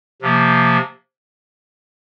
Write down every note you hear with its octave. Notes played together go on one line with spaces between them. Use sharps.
C3 F3 A#3